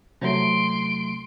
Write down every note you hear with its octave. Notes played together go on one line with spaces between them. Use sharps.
C3 F#3 A3 C6 D7